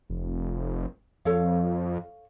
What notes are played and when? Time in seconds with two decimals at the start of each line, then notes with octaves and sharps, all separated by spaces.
0.10 F1
1.25 F2 A4 C#5 F5